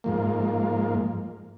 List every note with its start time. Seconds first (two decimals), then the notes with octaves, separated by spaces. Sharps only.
0.04 G#2 F3 A#3